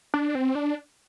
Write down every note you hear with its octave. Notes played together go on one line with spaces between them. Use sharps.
D4
C4
D4